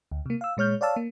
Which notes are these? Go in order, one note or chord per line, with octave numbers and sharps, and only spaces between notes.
D2
C3 A#3
F5 E6
A#2 G#3 C#5 F6 G6
C#5 D5 F5 A5 E6
A#3